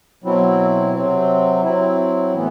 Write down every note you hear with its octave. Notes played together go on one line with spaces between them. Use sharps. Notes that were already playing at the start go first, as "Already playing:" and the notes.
B2 F#3 C4 E4
C3 F#3 C4
F#3 C4 E4
A2 E3 B3